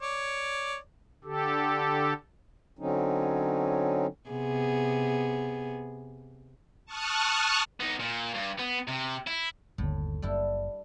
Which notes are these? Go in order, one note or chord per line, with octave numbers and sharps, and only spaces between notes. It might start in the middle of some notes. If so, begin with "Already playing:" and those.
C#5 D5
D3 G4 A4
D3 F#3 C4 C#4 D#4
C3 B3 G#4
A5 C#6 D#6 F6 F#6
B3 D#4
A#2
G2
B3
C3
E4
G1 D#2 A2 D3
F#1 G3 D4 E4